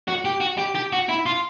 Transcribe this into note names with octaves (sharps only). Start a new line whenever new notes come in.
F#4
G4
F#4
G4
G4
F#4
E4
F4